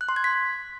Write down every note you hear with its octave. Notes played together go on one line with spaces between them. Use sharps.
F#6
C6
G#6
B6